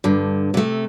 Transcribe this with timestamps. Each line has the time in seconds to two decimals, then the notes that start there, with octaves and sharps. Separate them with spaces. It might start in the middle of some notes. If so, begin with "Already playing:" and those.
0.04 G2 D3
0.54 C3 A3